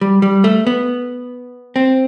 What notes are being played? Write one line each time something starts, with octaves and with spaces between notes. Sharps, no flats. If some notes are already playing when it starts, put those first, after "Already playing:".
G3
G3
A3
B3
C4